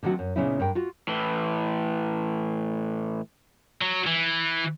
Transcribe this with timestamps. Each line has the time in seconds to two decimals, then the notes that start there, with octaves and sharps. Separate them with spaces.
0.03 D3 D#3 F#3 C4 F#4
0.19 F#2
0.36 A#2 C#3 B3 C#4 D#4 E4
0.60 G2 A#4 G5
0.75 F4 F#4
1.08 A2 E3
3.81 F#3
4.07 E3